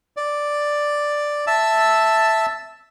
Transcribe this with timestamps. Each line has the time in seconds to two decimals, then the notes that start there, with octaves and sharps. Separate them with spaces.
0.17 D5
1.47 E5 A5 E6